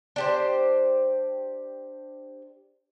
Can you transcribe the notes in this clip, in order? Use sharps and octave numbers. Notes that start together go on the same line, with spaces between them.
D4 G4 C5